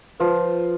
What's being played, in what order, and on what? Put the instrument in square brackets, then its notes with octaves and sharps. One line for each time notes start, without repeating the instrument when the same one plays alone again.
[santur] F3 [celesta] B4